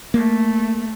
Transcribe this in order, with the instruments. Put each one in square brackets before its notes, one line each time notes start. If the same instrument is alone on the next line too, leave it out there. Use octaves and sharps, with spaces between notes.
[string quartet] A3 [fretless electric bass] A#3